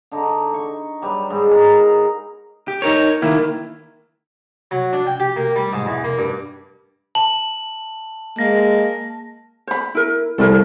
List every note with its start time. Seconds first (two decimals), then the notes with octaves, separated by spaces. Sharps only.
0.11 D3 D#4
0.54 C#6
1.02 F#3 G3 B4
1.30 G#2 G#3
1.50 F#4 G#4 A#4 A#5
2.68 G4
2.82 D#4 A#4 C#5
3.22 D#3 A#3 E4
4.71 F#3
4.93 D4
5.07 G5
5.20 G4
5.36 A#3
5.56 G3
5.73 G#2
5.86 E2
6.04 A#3
6.18 G2
7.15 A5 F#7
8.39 G#3 A#3 A#6
9.67 C5 B5
9.95 E4 A#4
10.38 C2 A4 A#4